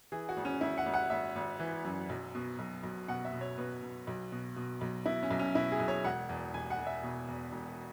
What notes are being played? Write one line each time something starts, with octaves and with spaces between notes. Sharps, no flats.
E3 G#4
F#4
G#1
C#4
G#1 E4
F#5
G#1
F#5
G#1 E5
G#1
E3
F#2
B1
B2
B1
B1
B2 F#5
E5
B2
C#5
B2 B4
B2
B1
B2
B2
B1
B2 E4
C#4
B1
C#4
B2 E4
G#4
B1
C#5
E1 F#5
E2
E1 G#5
F#5
E1
E5
B2
E2
E1